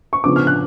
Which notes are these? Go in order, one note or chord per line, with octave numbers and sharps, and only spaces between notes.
C#6
C#3 F3 B3 D4 D6
F6
F#6